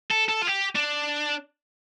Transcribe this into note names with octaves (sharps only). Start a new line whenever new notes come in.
A4
A4
F4
G4
D4